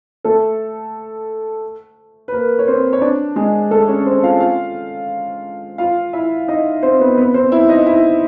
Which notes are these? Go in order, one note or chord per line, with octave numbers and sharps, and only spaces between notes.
A3 A4
B4
A#3 A#4
C#5
C4 C5
C#5
D4 D5
G#3 G#4
A3 A4
C#4 C#5
C4 C5
F4 F5
F4 F5
F4 F5
E4 E5
D#4 D#5
C4 C5
B3 B4
B3 B4
C4 C5
E4 E5
D#4 D#5
E4 E5